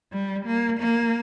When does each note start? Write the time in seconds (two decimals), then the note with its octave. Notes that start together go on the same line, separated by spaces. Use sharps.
0.12 G3
0.46 A#3
0.79 A#3